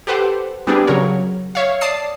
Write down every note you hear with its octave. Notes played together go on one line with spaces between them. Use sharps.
G4 A4 B4 C5 F#5
G3 B3 C4 D4 G4 G#4
C#3 F#3 A#4 C#5
C#5 E5 F5
D5 A5 D#6 C7